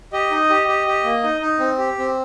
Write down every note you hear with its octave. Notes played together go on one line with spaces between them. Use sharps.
G4 D#5
D#4
G4
G4
G4
A#3
D#4
D#4
C4
G4
C4